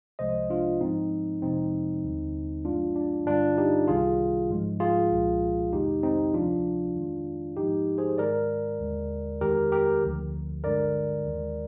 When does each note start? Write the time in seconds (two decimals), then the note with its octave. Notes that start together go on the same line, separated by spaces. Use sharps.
0.19 C2 C3 F3 G#3 C5 D#5
0.50 D4 F4
0.81 G#2 F3 G#3 C4 D#4
1.42 F2 C3 F3 G#3 C4 D#4
2.04 D#2 D3 G3
2.65 G2 F3 G#3 D4 F4
2.96 D4
3.26 G2 D3 G3 D4 F4
3.57 D#4 G4
3.88 C2 C3 D#3 G3 F4 G#4
4.50 G#2 F3 G#3
4.80 F4 G#4
5.12 C2 A#2 F3 G#3
5.73 F2 C3 D#3 G#3 D#4 G4
6.03 C4 D#4
6.34 D2 C3 F3 D4 F4
6.95 F2 D#3 G#3
7.57 G#2 F3 G#3 D#4 G4
7.98 G#4 C5
8.18 G#2 D#3 G#3 A#4 D5
8.80 D#2 D3 G#3
9.41 F2 D#3 G#3 G4 A#4
9.72 G4 A#4
10.02 D2 D3 F3
10.64 G2 D3 G#3 A#4 D5
11.26 D#2 D#3 G#3